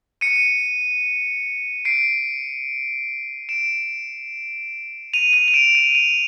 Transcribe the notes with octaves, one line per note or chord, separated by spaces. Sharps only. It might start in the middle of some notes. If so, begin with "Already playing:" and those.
C#7 D#7
C7 D7
D7 E7
D#7 F7
D#7 F7
F7
D7 E7
D#7 F7
D#7 F7